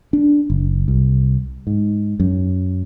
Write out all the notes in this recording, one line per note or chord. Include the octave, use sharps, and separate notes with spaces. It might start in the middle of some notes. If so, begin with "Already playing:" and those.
D4
F#1
C2
G#2
F#2